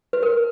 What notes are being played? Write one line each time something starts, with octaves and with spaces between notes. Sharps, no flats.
B4
A#4